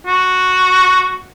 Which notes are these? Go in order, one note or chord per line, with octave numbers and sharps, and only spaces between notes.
F#4